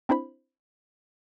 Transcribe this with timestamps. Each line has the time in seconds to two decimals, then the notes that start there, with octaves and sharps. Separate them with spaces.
0.09 C4 D4 E4 C5 B5